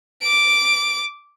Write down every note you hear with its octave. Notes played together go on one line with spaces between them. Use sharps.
D6 D7